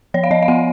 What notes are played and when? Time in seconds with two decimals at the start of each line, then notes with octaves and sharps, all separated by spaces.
0.14 F3 C#5
0.24 F5
0.31 F3 D#5
0.42 F5
0.48 B3 F#5